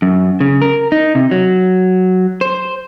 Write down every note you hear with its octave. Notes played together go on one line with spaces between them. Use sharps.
F#2
C#3
A#4
D#4
C3
F#3
C5